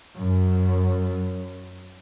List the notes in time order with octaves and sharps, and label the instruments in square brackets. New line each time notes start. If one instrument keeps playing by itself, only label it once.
[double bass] F#2